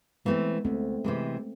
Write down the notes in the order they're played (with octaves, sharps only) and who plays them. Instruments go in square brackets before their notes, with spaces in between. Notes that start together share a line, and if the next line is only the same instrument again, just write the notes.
[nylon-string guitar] E3 A3 C4 [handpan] G#3 B3
[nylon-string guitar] D2 [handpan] A3 C4
[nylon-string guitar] C3 E3 G#3